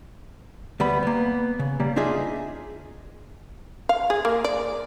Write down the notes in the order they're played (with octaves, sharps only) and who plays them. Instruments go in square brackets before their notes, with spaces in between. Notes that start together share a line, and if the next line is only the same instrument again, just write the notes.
[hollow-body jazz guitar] D2 G3 B3 B5
A#3 B3
C#3
C#3 G3 A#3
D4 D#4 F4 G#4 E5
[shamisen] F5
G#4
A#3
D5